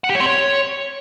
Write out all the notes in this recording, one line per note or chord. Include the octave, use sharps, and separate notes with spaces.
F#5
G4
C#5
C4
C#5